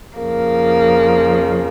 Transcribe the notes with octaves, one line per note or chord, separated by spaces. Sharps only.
F2 C#3 F3 A#3